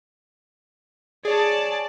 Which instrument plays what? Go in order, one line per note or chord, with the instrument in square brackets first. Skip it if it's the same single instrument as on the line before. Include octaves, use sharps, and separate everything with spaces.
[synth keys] G#4 C#5 [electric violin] D5 A5